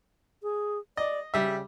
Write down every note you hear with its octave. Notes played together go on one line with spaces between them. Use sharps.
G#4
D5 D#5
C#3 G3 E5